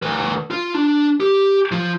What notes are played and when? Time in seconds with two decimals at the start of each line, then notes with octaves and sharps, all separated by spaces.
0.02 D2 B4
0.51 F4
0.74 D4
1.20 G4
1.71 F3 F4